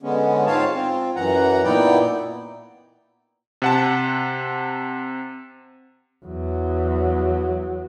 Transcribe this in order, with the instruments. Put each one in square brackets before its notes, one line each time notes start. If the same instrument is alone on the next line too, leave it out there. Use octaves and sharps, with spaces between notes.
[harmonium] D3 G#3 B3 C#4
G#2 C4 F4 C#5 F5 A5
C4 F4
F#2 E3 F#5 A#5
A#2 B3 D#4 E4 D5 G5
[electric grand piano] C3 F#5 A5
[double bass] E2 F#3